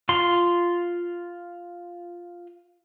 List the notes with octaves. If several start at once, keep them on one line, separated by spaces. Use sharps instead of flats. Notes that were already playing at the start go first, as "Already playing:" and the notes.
F4 C6